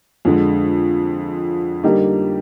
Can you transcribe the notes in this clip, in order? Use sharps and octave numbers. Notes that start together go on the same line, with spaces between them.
F2 D3 G#3
D3 G3 A#3 D#4 G4